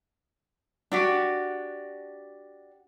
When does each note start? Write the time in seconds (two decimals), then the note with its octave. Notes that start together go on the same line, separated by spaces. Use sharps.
0.92 D4 F#4 G4